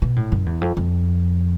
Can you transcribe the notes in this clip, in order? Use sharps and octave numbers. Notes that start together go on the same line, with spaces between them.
B2
A2
F#2
E2
F2
F2